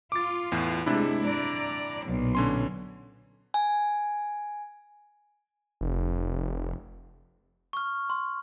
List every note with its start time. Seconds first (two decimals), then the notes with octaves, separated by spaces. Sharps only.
0.12 F4 D6 A6
0.52 E2 A2
0.86 C3 G#3 A3 D4 E4
1.23 D5 A#5
2.04 B1 A#2
2.35 D3 C#4 C6
3.54 G#5
5.81 F1
7.73 C#6 F6
8.10 C6